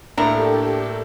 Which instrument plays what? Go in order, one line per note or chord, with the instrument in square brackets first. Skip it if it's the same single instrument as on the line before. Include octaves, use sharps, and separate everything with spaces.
[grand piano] A2 A3 A#3 [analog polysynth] D4 [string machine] G4 A4 [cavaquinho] A#5